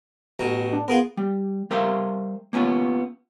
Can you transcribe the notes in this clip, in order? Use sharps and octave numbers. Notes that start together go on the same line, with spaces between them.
A1 B2 A#5
D4
B3 F4 G#4 A#4
G3
G3 A#4 C5 E5 F5
A#3 B3 C#4 F4